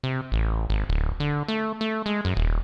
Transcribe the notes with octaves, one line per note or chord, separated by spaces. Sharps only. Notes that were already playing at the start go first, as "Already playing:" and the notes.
C3
A1
G#1
D1
D3
A3
A3
G#3
F#2
D#1